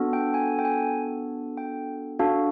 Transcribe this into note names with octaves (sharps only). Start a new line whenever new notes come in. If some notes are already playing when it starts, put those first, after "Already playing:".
Already playing: B3 D4 F#4 A4
G5
G#5
G5
G#5
G5
D4 F#4 A4 F5